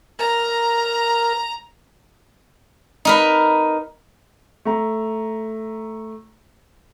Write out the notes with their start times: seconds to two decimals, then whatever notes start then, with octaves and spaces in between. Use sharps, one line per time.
0.19 A#4 A#5
3.05 D#4 A#4 B4
4.65 A3 A#5